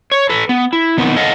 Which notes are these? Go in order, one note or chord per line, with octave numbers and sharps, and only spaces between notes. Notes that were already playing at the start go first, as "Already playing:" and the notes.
C#5
A4 B4
B3
E4
D#3 B3 C4 D#4
A4 D#5 F5 F#5